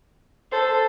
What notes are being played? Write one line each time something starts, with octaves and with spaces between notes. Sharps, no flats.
A4 C5